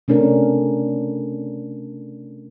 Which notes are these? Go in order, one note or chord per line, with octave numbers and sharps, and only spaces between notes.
C3 A3 C#4 D4 A#4